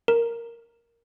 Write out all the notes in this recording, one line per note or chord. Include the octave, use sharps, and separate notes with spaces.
A#4